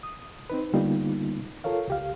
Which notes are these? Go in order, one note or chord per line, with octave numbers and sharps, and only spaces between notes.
D#6
C4 D#4 B4
D3 G3 A#3 B3 D#4 F4
F4 A4 A#4 C#5 F5
C#2 G4 F5